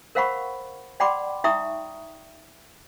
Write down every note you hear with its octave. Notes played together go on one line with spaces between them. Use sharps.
A#4 C5 F5 F#5 B5 C#6
D5 F#5 G5 B5 C6 D6
D#4 E5 G5 A#5 C#6 D#6